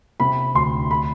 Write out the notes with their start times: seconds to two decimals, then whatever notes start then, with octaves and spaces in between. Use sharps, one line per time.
0.20 C3 B5
0.54 D2 C6
0.91 B5